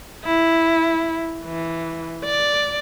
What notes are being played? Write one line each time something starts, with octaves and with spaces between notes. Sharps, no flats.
E4
E3
D5